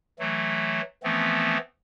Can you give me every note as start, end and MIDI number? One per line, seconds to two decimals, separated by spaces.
0.19 0.81 52
0.19 0.81 54
0.19 0.81 57
1.04 1.58 52
1.04 1.58 53
1.04 1.58 57
1.04 1.58 59
1.04 1.58 60